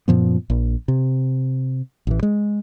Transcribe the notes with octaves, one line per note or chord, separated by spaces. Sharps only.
F#2 A#2 F3 B3
A#1
C3
A1 E3
G#3